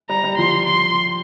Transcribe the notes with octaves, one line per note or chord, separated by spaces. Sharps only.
G3 A#5
G3
F3 C6
C6